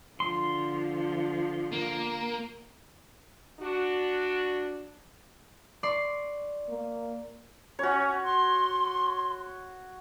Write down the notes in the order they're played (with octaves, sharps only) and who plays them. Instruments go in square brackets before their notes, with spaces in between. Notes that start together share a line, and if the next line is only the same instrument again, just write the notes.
[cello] D3 F3 [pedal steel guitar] C6
[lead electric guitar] A#3
[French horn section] D4 F#4
[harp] D5 C6 C#6
[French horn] A#3
[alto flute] C#4 [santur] F#4 C#5
[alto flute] C6